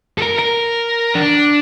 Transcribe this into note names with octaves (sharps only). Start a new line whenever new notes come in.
A4
A#4
A#4
D4